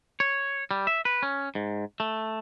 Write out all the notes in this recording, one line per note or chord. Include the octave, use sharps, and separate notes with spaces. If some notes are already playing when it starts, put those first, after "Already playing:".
C#5
G3
E5
B4
C#4
G#2
A3